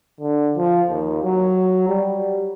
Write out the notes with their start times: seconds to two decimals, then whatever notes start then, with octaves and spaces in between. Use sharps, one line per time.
0.20 D3
0.57 F3
0.89 D#2
1.24 F#3
1.88 G3